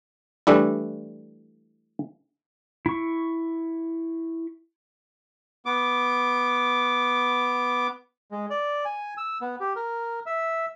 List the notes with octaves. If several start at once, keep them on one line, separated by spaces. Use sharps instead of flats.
E3 G3 A3 D4 E4
E4 C#6
B3 D6
G#3
D5
G#5
E6
B3
G4
A#4
E5